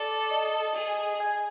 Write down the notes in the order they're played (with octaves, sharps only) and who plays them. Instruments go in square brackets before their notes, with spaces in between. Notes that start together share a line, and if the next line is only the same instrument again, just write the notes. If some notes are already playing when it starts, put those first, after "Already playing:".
Already playing: [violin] A4 [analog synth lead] D5
[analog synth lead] D#5
[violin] G#4
[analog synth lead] G#5